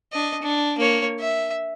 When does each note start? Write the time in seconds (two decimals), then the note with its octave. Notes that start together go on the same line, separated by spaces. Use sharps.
0.13 D4 D#5
0.42 D4
0.78 A#3 C#5
1.20 E5